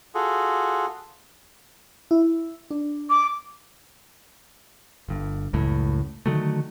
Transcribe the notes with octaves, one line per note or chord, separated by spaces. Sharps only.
F4 F#4 G#4 A4
E4
D4
D6
G1 G2
C#2 F#2 A2
D3 D#3 F#3 A3